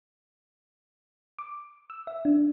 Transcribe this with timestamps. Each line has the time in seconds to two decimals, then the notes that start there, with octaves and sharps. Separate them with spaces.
1.39 D6
1.90 E6
2.07 E5
2.25 D4